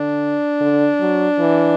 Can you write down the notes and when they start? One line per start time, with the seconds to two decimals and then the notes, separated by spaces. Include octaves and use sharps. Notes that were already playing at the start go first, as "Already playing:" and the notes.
Already playing: D3 D4
0.60 D3
1.00 F#3
1.39 E3